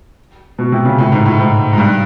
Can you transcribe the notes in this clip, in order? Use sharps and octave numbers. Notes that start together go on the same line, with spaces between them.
B2
C3
C#3
A2
G#2
A2
G#2
G#2
G2